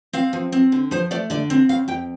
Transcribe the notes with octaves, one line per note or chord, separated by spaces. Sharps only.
C4 F5
F3
C4
D3
F3 C5
A3 D5
D3 D5
C4
C#3 F5
F2 G5